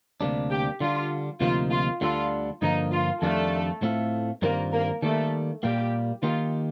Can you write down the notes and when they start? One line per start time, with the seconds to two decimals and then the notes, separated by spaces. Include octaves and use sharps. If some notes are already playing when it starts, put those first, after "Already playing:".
0.21 D2 C3 G3 A#3 D4
0.51 G4
0.80 D3 G3 D4 F4
1.41 D2 C3 F3 A#3 D#4 F4
1.71 F4
2.01 D2 D3 G3 D4 F4 A4
2.62 G2 D3 F3 A#3 D#4
2.92 F4
3.22 F2 D#3 G3 A3 D4 F4 A4
3.82 A2 A3 C4 F4 A4
4.42 G2 D#3 G3 A#3 C4 F4 A#4
4.72 A#3 A#4
5.02 D#3 G3 A3 A#3 A4
5.63 A#2 G3 A#3 F4 G4
6.23 D#3 A#3 D#4 F4 G4